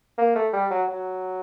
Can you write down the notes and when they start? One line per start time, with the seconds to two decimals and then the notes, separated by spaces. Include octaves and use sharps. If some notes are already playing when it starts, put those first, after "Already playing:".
0.18 A#3
0.35 A3
0.53 G3
0.70 F#3
0.89 F#3